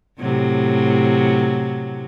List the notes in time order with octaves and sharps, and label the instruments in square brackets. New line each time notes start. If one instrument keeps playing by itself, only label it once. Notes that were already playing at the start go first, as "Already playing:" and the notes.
[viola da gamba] A2 C3 F#3